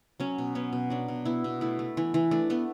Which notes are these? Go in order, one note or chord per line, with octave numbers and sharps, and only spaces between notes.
F#3 C#4
B2
B3 C#4
B2
F#3 D4
B2
B3 E4
B2
A3 E4
A3
E3
E3
A3 D4
A3 B3